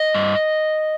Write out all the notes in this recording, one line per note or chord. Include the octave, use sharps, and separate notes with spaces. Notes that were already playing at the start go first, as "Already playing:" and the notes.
Already playing: D#5
G2